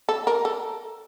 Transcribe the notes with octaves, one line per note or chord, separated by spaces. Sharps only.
A4
A#4
A4